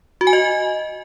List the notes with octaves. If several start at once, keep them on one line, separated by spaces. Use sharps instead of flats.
F#4
G#5
D#5